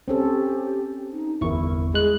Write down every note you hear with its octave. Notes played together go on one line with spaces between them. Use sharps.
C4 C#4 G4 A4
D#4
G1 E2 E4 A#4 C#6
G#3 G#4 F#6